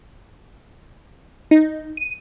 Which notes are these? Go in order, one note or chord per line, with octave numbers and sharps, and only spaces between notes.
D#4
D#7